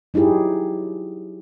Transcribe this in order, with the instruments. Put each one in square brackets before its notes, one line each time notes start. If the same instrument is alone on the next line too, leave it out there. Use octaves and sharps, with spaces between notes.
[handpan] F#3 D#4 E4 G4 G#4